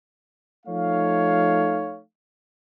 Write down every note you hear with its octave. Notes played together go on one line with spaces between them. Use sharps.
F3 A3 D#4 C#5 F5